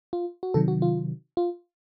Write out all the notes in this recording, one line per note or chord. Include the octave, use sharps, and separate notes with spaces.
F4
F#4
C3 D#3 F#3 A4
F#4
F4
F4